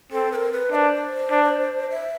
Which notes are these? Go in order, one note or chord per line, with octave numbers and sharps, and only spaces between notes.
C4 A4
B4
A#4
B4
D4 C5 E5
D4
E5